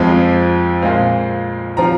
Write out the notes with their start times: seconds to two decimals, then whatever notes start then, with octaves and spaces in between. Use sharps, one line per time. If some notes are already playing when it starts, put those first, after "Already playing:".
Already playing: F2 F3 G#3 C4
0.82 A#2 G#3 C4 F5
1.77 F3 C4 A#5